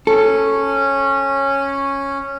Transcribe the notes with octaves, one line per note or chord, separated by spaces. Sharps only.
C#4 A4